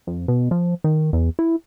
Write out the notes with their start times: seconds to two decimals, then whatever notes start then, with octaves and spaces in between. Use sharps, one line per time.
0.07 F2
0.28 B2
0.51 F3
0.84 D#3
1.13 E2
1.39 E4